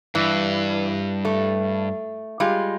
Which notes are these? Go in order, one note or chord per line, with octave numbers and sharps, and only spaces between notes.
G2 E3
A3
G3 G#3 F4